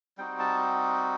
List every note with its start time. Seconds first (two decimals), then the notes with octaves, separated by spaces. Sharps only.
0.18 G3 C4 D#4 F#4 G5
0.39 A5